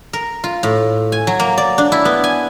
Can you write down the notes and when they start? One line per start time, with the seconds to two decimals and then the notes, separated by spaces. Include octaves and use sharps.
0.13 A#4
0.44 F4
0.63 A2
1.12 G#5
1.27 F#3
1.40 A#3
1.58 D5
1.78 D4
1.92 E4
2.05 B3
2.24 G#5